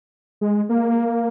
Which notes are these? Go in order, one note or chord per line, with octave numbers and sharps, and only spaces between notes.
G#3
A#3